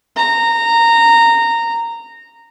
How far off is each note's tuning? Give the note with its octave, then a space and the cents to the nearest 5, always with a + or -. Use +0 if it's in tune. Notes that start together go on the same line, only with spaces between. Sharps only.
A#5 -15